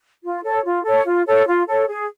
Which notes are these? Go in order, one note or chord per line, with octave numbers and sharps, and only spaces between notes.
F4
A4 C#5
F4
A4 C#5
F4
A4 C#5
F4
A4 C#5
G#4